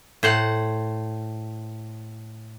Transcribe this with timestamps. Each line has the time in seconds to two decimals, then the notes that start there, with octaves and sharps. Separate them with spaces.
0.23 A2 C5 F#5